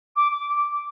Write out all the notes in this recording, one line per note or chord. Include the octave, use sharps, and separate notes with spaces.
D6
D6